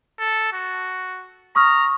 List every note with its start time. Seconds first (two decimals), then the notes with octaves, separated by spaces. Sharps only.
0.19 A4
0.53 F#4
1.56 A#5 C#6 D#6 F6